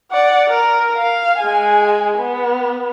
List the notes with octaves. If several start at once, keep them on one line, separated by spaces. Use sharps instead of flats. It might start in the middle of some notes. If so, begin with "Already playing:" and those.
D5 F#5
A#4
F5
G#3 G#5
B3